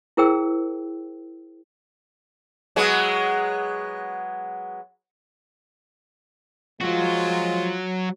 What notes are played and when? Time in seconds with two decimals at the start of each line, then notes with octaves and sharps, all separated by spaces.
0.17 E4 G#4 A#4 C5 G5 E6
2.76 F#3 G#3 B3
6.81 F3 F#3 G#3 F4 F#4